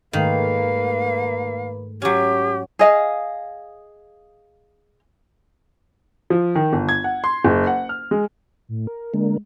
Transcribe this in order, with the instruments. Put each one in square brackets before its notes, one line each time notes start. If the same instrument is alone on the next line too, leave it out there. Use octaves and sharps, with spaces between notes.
[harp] G#2 A3 [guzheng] D#3 [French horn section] A#3 B4 [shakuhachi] F5
[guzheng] F#3 C#4 [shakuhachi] G4
[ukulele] G#4 D#5 F5
[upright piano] F3
D#3
G1
G#6
F#5
C6
F#1
F#5
F6
G#3
[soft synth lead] A2
A#4
[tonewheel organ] D3 A#3 [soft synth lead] G#3